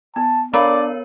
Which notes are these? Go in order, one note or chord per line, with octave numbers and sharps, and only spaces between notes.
B3 A5
B3 D4 A#4 C#5 D5 F5 A#5 B5